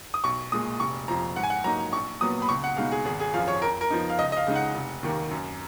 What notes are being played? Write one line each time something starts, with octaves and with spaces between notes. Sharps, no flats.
D#6
B1 C#6
A#2 G#3 D#6
F1 C#6
F2 F3 A#5
G#2 F#5
G#5
F#5
F#3 A#3 D#4 A#5
A#1 C#6
A#2 F#3 B3 D#6
B5
C#2 C#6
F#5
B2 G#3 D#4 F5
G#4
G#1 G#4
G#4
F#2 F3 F5
C#5
F2 A#4
A#4
F3 B3 D#4
F5
C#2 D#5
D#5
F5
C#3 G#3 D#4
F#5
F1
D#2 D#3 A#3
F#2